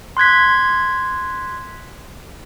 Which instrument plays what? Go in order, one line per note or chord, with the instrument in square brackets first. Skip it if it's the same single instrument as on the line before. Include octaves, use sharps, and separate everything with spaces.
[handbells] C6 F#6 G#6 B6